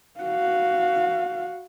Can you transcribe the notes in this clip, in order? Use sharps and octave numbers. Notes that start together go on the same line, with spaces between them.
F#4 F5